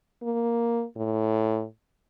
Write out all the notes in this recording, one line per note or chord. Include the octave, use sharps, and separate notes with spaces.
A#3
A2